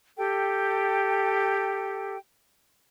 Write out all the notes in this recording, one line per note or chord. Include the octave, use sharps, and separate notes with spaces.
G4 A4 G5